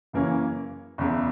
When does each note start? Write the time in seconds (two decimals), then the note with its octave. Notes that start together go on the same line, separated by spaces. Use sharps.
0.13 F#2 C#3 E3 A#3 C#4
0.98 F#1 E2 C#3